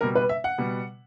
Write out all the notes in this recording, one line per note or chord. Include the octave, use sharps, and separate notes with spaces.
B2 G3 A#4
B4
E5
F#5
B2 G3